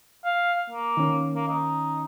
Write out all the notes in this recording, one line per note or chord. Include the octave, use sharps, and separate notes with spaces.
F5
A#3
D#3 C#4
A#3
D#4